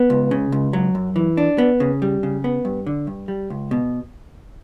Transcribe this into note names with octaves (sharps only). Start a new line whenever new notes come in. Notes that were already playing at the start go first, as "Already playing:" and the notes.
Already playing: B3
C#2
C#3
C#2
F#3
F#2
E3
D4
B3
C#3
G3
C#3
B3
G2
D3
G2
G3
C#2
B2